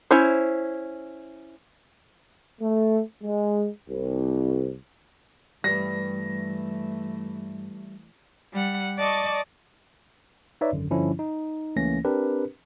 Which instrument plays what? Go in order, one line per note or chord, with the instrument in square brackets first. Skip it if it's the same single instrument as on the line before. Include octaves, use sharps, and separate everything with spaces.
[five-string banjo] C#4 E4 C5
[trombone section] A3
G#3
C2
[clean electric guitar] G2 B4 [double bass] E3 A3 [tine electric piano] G3 [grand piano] A#6
[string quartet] G3 F#5
D5 D#5 A5 C#6 D6
[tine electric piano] D#4 B4 C#5 D5 E5
G#1 F#2 D3
G2 D3 F3 C#4 D4 E4
D#4
C#2 E3 A3 A#3 C#4 A#6
C4 D4 G4 A#4 B4